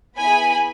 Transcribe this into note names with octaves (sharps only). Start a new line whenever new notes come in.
B3 E4 G#4 G#5 B5